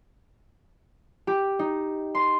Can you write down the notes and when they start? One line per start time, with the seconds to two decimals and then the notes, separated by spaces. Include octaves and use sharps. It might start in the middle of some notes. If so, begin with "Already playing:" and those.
1.27 G4
1.59 D#4
2.15 C6